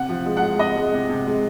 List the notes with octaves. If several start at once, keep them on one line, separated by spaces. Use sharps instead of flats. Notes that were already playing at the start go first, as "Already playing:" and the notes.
Already playing: C3 F#5
F3
G#3
G#3 F#5
C3 D#5
G#3
C3
C3
G#3